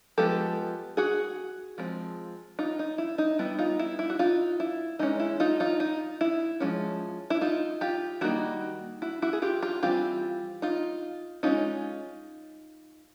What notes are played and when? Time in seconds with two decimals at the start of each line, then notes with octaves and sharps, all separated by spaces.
0.18 F3 G#3 B3 G4 A4
0.97 F#4 G#4
1.78 F3 G#3 C4
2.59 D#4 F4
2.79 D#4
2.98 E4
3.18 D#4
3.39 G3 B3 D4 E4
3.59 D#4 F4
3.79 E4
3.99 E4
4.10 F#4
4.19 D#4 F4
4.60 E4
4.99 E3 G#3 C#4 D#4
5.19 E4
5.40 D#4 F4
5.60 D#4 F4
5.80 D#4
6.21 E4
6.60 F3 G#3 C#4
7.30 E4
7.41 D#4 F4
7.81 F4 G4
8.21 D#3 G3 A#3 D#4 E4 F#4
9.02 E4 F#4
9.22 E4 F#4
9.33 G#4
9.42 F4 G4
9.63 F4 G4
9.83 E3 G3 C4 F4 G4
10.62 D#4 F4
11.43 G#3 C#4 D#4 F4